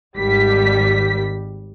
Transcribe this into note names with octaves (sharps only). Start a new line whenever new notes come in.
G#1 G3 B6